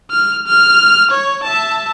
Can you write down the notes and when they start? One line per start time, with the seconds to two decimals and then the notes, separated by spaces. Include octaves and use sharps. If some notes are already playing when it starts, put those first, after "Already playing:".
0.11 F6
0.47 F6
1.11 C#5
1.44 E5 A5